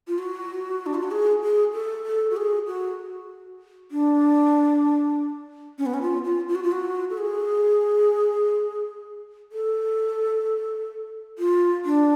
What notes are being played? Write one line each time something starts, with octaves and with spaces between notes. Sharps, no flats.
F4
F#4
D4
F4
F#4
G#4
G#4
A4
A4
F#4
G#4
F#4
D4
C#4
B3
C#4
F4
F4
F4
F#4
F4
F#4
A4
G#4
A4
F4
D4